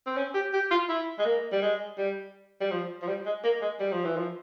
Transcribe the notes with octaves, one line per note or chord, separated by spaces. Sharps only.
C4
C#4
G4
G4
F4
E4
G#3
A#3
G3
G#3
G3
G3
F3
F3
G3
G#3
A#3
G#3
G3
F3
E3
F3